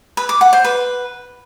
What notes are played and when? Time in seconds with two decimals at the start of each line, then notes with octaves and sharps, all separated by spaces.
0.17 B4
0.29 D6
0.41 F#5
0.53 C5
0.64 B4